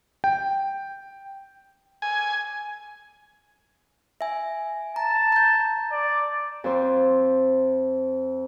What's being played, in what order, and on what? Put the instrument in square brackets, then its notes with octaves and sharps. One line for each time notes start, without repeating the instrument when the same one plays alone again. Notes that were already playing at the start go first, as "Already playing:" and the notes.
[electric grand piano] G5
[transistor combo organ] G#5
[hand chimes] E5 G#5
[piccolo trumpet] A5 [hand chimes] A#5
[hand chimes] A#5 G6
[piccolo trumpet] D5
[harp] F2 C5